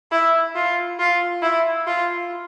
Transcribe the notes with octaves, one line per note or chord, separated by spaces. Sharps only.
E4
F4
F4
E4
F4